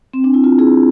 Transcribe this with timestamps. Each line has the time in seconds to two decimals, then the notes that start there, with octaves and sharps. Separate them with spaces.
0.14 C4
0.24 D4
0.34 E4
0.44 F4
0.59 E4 G#4